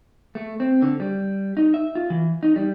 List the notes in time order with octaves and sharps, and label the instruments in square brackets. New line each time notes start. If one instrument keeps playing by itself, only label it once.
[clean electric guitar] A3
C4
D3
G3
D#4
E5
F4
E3
D#4
G3